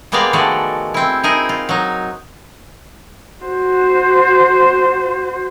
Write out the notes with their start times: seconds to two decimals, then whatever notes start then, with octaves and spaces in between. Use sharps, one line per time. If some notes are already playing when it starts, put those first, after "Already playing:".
0.12 G3 G#3 A#3 B3 D5 F5
0.33 D#3 F3 G#3 A3 F#4 D5
0.94 C4 E4
1.24 D#4 E4 G#4 A#4
1.49 F4
1.69 F#3 D#4
3.45 F#4 C5